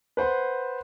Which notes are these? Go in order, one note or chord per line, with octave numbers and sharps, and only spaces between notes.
B4 C5 F#5 C6